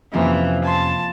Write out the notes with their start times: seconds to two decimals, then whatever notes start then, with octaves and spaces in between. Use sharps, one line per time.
0.13 F2 C3 E3 F3 A#3 C4 C#4
0.64 G#5 A5 B5 C6